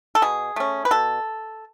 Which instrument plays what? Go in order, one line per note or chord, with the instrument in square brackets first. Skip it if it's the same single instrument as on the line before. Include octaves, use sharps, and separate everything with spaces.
[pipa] A4
B2 G#4
A3 C#4
B4
B2 A4